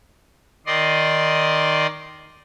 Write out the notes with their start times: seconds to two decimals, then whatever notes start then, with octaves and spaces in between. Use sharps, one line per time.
0.66 D#3 D5 D#5 C6